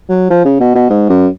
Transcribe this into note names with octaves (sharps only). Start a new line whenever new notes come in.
F#3
F3
C#3
B2
B2
G#2
F#2